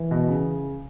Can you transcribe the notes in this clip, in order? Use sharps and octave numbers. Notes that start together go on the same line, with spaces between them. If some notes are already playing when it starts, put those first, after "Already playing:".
Already playing: E3
B2
C#3